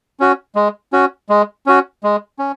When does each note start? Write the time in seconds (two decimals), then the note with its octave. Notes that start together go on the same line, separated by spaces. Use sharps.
0.20 C#4 F#4
0.55 G#3
0.93 C#4 F#4
1.29 G#3
1.66 C#4 F#4
2.03 G#3
2.39 C#4